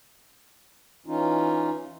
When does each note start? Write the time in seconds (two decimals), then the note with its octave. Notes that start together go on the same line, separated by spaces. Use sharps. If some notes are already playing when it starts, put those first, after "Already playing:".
1.06 E3 C#4 D#4 F4